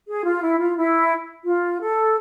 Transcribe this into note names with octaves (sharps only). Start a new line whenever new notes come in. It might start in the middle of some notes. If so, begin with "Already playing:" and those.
G#4
F4
E4
F4
E4
F4
A4